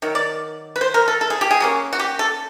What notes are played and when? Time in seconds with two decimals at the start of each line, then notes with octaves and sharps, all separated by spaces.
0.02 D#3 F#3
0.15 D5
0.76 B4
0.81 C5
0.94 A#4
1.08 A4
1.21 A4
1.30 G#4
1.41 G4
1.51 G#4
1.60 F#3 A#3 C#4
1.93 F#4
2.00 G4
2.19 A4